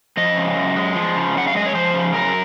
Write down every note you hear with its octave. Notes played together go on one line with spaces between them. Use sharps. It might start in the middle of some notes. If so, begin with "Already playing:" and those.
F3 D#5
C#3
F#2
G#3
F3
C#3
F#2 F#5
F5
G#3 D#5
C#5
F3 C5
C#3
F#2 A#4